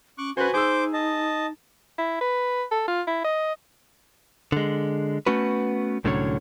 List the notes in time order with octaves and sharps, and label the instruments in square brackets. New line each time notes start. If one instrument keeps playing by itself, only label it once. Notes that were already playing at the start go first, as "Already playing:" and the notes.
[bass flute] C#4 [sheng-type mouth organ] C#6 D6 F#6
[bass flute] C#4 [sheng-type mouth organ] F#4 F#5 G#5 [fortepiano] B4 C5
[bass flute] D#4 [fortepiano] G#4 E6 [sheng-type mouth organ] C5 D6 G6
[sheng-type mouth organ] D#5 A5
[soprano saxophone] E4
B4
A4
F4
E4
D#5
[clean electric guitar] D3 G#3
A3 B3 C#4 F#4 B4
C2 A2 D3 F#3 C#4 C#5